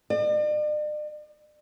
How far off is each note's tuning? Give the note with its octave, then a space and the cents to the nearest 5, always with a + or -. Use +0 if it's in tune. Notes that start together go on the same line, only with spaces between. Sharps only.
D5 +45